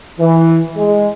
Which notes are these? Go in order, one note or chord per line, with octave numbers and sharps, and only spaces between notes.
E3
G#3